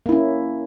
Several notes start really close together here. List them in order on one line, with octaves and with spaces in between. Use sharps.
A#3 E4 C#4